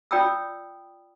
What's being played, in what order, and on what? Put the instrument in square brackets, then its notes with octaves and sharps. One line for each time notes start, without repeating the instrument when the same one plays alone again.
[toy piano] F4 D5 G5 B5 D#6 E6